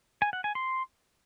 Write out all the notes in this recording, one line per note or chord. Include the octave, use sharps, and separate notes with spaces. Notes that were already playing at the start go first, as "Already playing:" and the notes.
G#5
F#5
G#5
C6